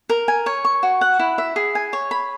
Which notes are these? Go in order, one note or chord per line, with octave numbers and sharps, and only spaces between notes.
A#4
G#5
C#5
C#6
F#4
F#5
E4
E5
G#4
G#5
C#5
B5